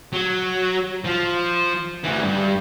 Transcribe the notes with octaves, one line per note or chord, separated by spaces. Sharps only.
F#3
F3
D2 E3
G2